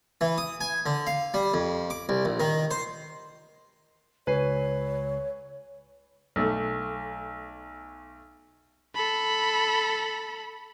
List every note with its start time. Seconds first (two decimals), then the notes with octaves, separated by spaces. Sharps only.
0.21 E3
0.38 D#6
0.61 G#5
0.86 D3
1.07 F5
1.34 G3
1.54 F2
1.90 D6
2.09 C2
2.25 A#1
2.40 D#3
2.71 C5
4.27 C#2 B4 C#5 G#5 C7
6.36 B1 A3
8.95 A4 B5